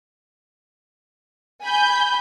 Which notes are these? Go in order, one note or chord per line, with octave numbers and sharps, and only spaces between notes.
G#5 B5 G6